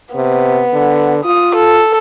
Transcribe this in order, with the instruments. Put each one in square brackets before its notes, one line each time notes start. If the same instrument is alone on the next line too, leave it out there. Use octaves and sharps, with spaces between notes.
[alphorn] C3 [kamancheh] B3
[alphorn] D3
[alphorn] F4 [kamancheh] D#6
[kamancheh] A4